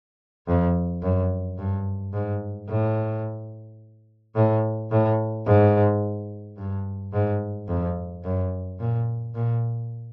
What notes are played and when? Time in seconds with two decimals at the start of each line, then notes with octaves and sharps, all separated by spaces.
0.47 F2
1.02 F#2
1.58 G2
2.13 G#2
2.69 A2
4.36 A2
4.91 A2
5.46 G#2
6.57 G2
7.13 G#2
7.68 F2
8.24 F#2
8.80 A#2
9.35 A#2